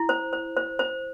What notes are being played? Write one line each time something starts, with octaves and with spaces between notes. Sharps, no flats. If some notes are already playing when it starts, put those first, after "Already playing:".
Already playing: E4
C5
C5
C5
C5